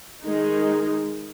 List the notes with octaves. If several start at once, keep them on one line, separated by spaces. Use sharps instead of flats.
D#3 G#3 D#4